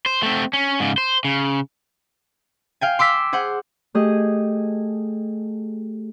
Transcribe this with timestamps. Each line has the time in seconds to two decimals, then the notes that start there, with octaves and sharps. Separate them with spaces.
0.06 C5
0.23 A3 C4
0.53 C#4
0.80 G#2 C#3
0.98 C5
1.25 C#3
2.81 F5 G5 G#5
2.99 C6 D6 E6 B6
3.33 G#4 C5 F#5
3.95 A3 G4 G#4 D#5